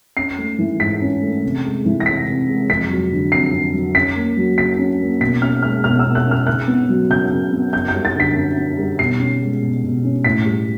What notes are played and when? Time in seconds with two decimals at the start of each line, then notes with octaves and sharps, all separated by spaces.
0.17 C#4 C7
0.38 A3
0.59 E3
0.80 G#2 B6
1.02 C#4
1.22 A3
1.43 C3
1.65 G#3
1.85 E3
2.00 A#6
2.06 C3 B6
2.27 C3
2.48 G#3
2.69 F2 B6
2.90 F#3
3.12 D3
3.32 F2 C7
3.53 F2
3.74 F#3
3.95 C#4 B6
4.16 A#3
4.37 F#3
4.58 C#3 B6
4.79 C#4
5.00 A#3
5.21 B2 B6
5.42 C#4 F6
5.63 G#3 F6
5.84 B2 F6
5.99 E6
6.05 B2
6.15 F#6
6.26 C#4
6.31 F6
6.47 C#3 F#6
6.68 B3
6.89 F#3
7.10 C#3 G6
7.32 C#3
7.52 B3
7.73 F#2 G6
7.88 G6
7.94 G3
8.05 A6
8.15 D3 B6
8.36 F#2
8.57 F#2
8.78 G3
8.99 B2 C7
9.19 C#4
9.41 G#3
9.62 B2
9.83 B2
10.05 C#4
10.24 A2 B6
10.46 G3